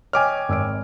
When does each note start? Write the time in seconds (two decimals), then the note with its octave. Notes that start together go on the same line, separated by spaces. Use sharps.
0.13 C#5 D#5 G5 G#5 D6 F6
0.49 G#1 E6 D7